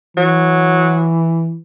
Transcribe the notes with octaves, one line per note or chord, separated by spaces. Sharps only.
E3 F#3